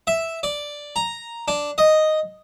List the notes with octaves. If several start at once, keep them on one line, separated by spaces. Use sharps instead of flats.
E5
D5
A#5
D4
D#5